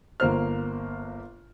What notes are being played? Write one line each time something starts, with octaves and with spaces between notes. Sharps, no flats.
G1 A#3 C5 F6